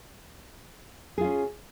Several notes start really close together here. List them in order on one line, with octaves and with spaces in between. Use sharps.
G#4 F4 C#4